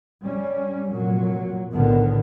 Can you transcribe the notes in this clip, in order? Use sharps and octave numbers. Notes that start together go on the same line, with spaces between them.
G3 C#4
F1 A#2 F#3
B1 A2 D3 D#3 B3